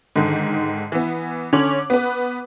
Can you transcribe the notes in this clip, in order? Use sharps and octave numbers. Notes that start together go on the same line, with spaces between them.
G#2 D3 D#3
E3 B3
D3 C#4 C#5 D6 F#7
B3 B4